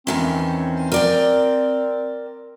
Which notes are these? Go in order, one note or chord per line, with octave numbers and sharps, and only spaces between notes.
E2 D#3 C4 C#4
A#4 D5 G5